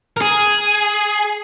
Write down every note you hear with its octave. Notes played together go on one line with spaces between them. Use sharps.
A#4
G#4